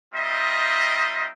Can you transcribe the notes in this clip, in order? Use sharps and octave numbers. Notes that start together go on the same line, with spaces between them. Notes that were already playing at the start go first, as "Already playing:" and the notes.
G3 C4 D#4 F4 D#5 E5